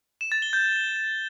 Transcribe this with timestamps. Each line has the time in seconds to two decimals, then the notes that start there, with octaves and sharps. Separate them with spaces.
0.21 E7
0.32 A6
0.42 G7
0.53 G6